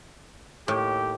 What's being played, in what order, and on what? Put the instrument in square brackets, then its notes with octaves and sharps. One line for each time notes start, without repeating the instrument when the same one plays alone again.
[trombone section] D#2 G4 [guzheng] A2